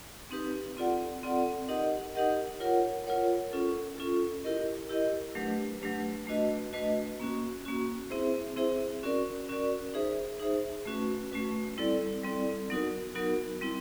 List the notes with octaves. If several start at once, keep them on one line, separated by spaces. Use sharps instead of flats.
C4 D#4 G4 B4
C4 F4 A4 D5 F#5
C4 F4 A4 D5 F#5
D#4 G4 A#4 D#5 F#5
D#4 G4 A#4 D#5 F#5
F4 A#4 C#5 F#5
F4 A#4 C#5 F#5
C#4 F4 A4
C#4 F4 A4
E4 G4 A#4 D#5
E4 G4 A#4 D#5
F#3 A3 D4 G4 B4
F#3 A3 D4 G4 B4
A3 D4 F#4 B4 D#5
A3 D4 F#4 B4 D#5
A#3 C#4 F#4
A#3 C#4 F#4
C4 E4 G#4 C5 E5
C4 E4 G#4 C5 E5
C#4 F#4 A#4 D5
C#4 F#4 A#4 D5
D#4 G#4 C5 E5
D#4 G#4 C5 E5
A3 C#4 F#4 B4
A3 C#4 F#4 B4
G3 C4 E4 A4 D5
G3 C4 E4 A4 D5
F#3 B3 D#4 F#4 A#4
F#3 B3 D#4 F#4 A#4
G3 C4 E4